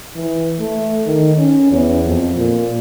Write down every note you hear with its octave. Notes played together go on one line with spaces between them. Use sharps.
E3
A3
D#3
C#4
E2
F2
A#2